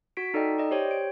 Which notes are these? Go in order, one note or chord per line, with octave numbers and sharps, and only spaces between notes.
F#4 B6 D7
D#4 A4 D5 D#5 G5
D5 D#5
G4 C5 C#5 G5
D7